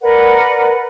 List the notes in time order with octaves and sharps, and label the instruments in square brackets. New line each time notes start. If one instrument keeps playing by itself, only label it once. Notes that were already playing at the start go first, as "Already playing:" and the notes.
[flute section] A#4 B4 D5 F#5